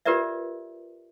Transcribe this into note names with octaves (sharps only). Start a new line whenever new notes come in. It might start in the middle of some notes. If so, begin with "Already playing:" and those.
F4 G4 A#4 B4 D5 E5